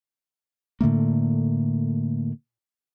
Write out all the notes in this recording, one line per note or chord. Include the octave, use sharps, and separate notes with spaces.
A2 D3 A3 A#3